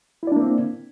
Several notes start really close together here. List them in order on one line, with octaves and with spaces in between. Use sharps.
E4 D5 D4 A#3 C4